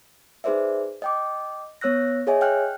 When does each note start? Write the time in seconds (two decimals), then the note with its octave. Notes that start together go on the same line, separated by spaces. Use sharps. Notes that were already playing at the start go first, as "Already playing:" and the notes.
0.44 D#4 G#4 B4 C5 D5 E5
1.02 D#5 G5 D6
1.81 B3 C#5 E6 F#6 A#6
2.27 G#4 C#5 D#5 E5 G#5
2.41 G5 F6 F#6